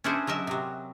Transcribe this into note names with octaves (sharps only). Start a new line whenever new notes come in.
C#4 D4 E4 G#4 B4 C5
F#3 A#4 D#5 E5
C3 F#3